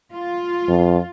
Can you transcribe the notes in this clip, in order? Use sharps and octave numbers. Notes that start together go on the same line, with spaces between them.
F4
F2